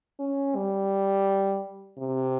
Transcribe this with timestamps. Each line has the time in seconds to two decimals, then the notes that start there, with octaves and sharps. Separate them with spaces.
0.19 C#4
0.55 G3
1.99 C3